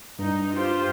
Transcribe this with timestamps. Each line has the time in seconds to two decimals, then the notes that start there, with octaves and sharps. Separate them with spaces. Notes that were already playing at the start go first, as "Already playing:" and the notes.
0.19 G2 D#4
0.54 F4 G4 C5